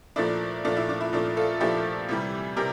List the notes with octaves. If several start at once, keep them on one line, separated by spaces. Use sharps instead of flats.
A#2 F3 A3 D4 E4
A#2 F3 A3 D4
E4
D4
E4
A#2 F3 A3 D4
F4 A4
A#2 F3 A3 D4 E4 G4
C3 E3 G3
C3 G4 A#4